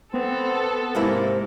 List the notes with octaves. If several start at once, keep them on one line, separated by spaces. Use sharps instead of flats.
B3 C4 A4
G#2 C3 A#3 E4